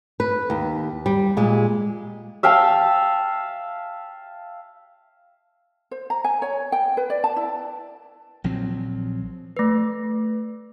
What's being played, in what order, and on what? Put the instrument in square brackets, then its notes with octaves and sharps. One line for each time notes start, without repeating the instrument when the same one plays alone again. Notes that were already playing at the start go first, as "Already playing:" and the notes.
[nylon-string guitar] B4
D#2
G3
A#2 G#3
[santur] E5 F5 G5 A5
[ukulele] C5
A#5
G#5
C#5
G5
B4
D5
A5
E4
[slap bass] A#1 F3 F#3 C4
[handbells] A3 B4